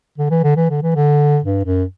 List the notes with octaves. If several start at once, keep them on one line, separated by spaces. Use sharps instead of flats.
D3
E3
D3
E3
D3
E3
D3
G2
F#2